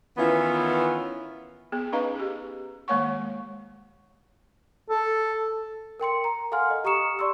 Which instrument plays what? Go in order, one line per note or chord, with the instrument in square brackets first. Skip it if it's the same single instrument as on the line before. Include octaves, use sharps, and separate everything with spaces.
[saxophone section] D#3 E3 B3 C#4 E4 F4
[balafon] B3 G#4
C#4 D#4 B4 D#5 F5 A#5
G4 G#4
D#3 G#3 A#3 C#5 F#5 C#6
[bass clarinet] A4
[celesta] A#4 G5 C6 C#7
A#5
A4 F5 F#5 G#5 C6 F6
D#5
G4 A#5 C#6 D#6 C#7 E7
D5 C6 C#6 E6